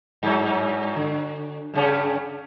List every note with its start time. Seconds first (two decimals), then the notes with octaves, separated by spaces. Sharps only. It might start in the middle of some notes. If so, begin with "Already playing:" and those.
0.23 G2 F#3
0.96 D3
1.74 G2 C#3 C#4